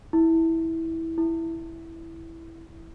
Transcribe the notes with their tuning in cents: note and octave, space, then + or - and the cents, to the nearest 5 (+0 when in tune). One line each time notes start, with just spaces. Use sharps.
E4 -15
E4 +0